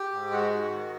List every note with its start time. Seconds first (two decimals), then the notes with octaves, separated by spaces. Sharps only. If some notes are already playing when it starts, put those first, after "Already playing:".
Already playing: G4
0.11 G#2
0.31 G#3 F#4
0.51 G#2
0.72 D#3